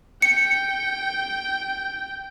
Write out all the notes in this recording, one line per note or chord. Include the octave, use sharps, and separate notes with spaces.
G5 C#7